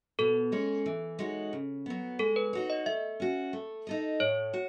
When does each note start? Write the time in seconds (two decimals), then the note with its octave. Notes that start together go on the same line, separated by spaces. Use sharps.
0.19 B2 A4
0.52 G#3 C#4 G#4 C#5
0.86 E3
1.19 G#3 D#4 F#4 C#5
1.53 C#3
1.86 F#3 B3
2.19 G#3 A4
2.36 B4
2.53 D#4 F#4 C#5
2.70 D#5
2.86 A3 E5
3.20 C#4 F#4
3.53 A3
3.87 D#4 A4 D#5
4.20 A2 C#5
4.54 F#4